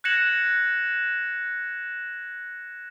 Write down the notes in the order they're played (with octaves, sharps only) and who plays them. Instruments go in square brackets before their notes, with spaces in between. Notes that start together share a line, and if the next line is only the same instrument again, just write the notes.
[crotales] F#6 G#6 A#6 C#7 E7 F#7